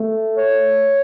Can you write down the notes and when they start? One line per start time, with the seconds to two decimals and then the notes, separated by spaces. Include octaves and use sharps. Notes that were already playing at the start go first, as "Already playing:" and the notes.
Already playing: A3
0.37 C#5